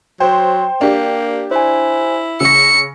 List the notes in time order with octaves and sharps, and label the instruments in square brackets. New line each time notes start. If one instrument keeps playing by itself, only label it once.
[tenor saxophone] F#3 [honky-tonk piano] C5 [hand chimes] G5
[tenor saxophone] A#3 [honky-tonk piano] D4 G4
[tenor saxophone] E4 [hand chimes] C5 G#5
[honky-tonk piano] C#3 A#6 [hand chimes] C#6 E6 [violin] C#7